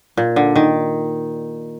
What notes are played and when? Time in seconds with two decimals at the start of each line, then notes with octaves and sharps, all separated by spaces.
0.17 A#2
0.36 D3
0.56 D#3